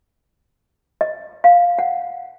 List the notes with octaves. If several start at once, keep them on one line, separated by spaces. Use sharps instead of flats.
D#5
F5
F#5